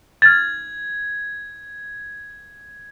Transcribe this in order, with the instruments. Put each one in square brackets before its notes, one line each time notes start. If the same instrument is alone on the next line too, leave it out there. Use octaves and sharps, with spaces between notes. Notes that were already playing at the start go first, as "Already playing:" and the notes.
[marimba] F6 A6 [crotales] G#6